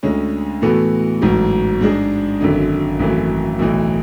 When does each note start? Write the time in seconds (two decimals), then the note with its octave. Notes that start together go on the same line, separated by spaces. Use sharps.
0.03 D2 D3 G#3 C#4
0.62 A2 E3 B3 F#4 A4
1.21 A1 G#2 F#3
1.81 G#2 G#3 D4 G#4
2.41 G#1 F#2 D3
2.99 G#1 F#2 E3 A3
3.59 B1 A2 E3